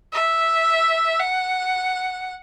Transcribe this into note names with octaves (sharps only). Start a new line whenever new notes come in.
E5
F#5